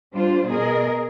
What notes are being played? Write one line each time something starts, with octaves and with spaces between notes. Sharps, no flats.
G3 D4 F4 C5
B2 G#4 A#4 D#5